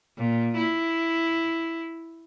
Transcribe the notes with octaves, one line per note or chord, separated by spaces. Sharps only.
A#2
E4